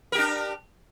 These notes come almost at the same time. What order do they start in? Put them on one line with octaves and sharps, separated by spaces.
A#4 G4 D4